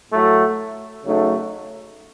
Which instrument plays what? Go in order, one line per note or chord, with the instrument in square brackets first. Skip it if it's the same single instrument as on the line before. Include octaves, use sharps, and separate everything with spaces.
[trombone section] A2 F#3 A3
C#3 F#3 A3 D#4